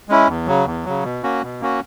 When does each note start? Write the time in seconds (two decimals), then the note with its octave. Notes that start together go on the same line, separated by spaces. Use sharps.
0.09 G#3 C#4 E4
0.28 E2
0.46 C#3 F#3
0.66 E2
0.85 C#3 F#3
1.04 B2
1.23 A#3 C#4 F#4
1.42 B2
1.61 A#3 C#4 F#4